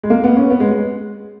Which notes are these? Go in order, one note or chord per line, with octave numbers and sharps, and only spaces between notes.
G#3
A#3
B3
C#4
B3
G#3
G#3